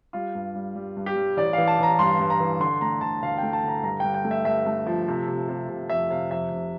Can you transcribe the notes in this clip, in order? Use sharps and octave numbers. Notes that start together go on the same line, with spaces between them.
G3 F4
G2
G3
G3
G2
G4
G3
A1 D5
E3 F5
A5
A1 A#5
G2 C6
G2
A#5
E3
D3 C6
A3 A#5
D3 A5
D2 F5
A3 G5
A5
D3 A#5
G2 A#5
G2 G5
G5
A3
E5
G2 E5
A3
F3
C3
C3
C3
C3
F2 E5
C3 F5
F2 E5
F1